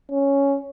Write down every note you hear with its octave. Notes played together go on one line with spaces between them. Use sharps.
C#4